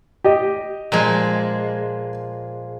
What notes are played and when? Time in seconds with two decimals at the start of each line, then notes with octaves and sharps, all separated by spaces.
0.24 G4 D#5
0.92 A#2 F3 G#3